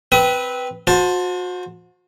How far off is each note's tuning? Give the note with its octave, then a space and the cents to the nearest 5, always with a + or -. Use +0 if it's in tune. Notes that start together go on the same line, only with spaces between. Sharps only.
C4 -15 B4 +0 D#6 +35
F#4 -35 C5 +5 A5 +0